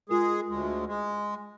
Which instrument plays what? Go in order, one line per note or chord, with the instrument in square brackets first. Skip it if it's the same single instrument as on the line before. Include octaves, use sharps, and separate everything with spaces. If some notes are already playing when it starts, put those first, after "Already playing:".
[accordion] G#3 G#4 [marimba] F4 A#4
[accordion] D2 G#3
G#3